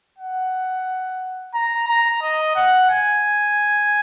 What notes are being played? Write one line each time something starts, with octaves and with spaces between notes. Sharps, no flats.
F#5
A#5
A#5
D#5
F#5
G#5